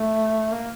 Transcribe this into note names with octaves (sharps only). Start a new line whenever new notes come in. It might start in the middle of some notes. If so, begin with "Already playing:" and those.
Already playing: A3
A#3